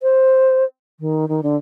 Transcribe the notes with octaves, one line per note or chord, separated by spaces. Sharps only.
C5
D#3
D#3
D3